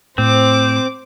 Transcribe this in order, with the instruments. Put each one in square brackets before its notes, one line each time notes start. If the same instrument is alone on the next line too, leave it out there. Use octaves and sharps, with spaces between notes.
[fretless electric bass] A2 [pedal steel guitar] C4 [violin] C5 D6